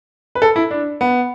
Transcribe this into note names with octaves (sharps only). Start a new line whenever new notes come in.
B4
A4
E4
D4
B3